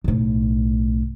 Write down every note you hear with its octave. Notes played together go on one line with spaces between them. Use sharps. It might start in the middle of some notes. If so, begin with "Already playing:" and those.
B1 A2